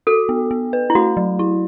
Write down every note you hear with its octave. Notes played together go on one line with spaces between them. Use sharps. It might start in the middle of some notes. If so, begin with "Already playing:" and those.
F#4 A4
B3
B3
B4
E4
A3 F#4
F#3
E4